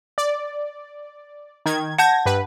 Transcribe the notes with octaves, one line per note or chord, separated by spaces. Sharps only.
D5
D#3 G#6
F#5 A5 G6 G#6 A#6
G2 B4